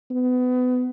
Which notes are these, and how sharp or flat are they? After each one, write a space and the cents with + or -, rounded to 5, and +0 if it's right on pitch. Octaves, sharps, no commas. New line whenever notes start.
B3 +25